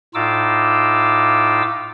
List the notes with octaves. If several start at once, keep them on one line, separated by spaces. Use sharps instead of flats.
A2 D#4 F4 D6 E6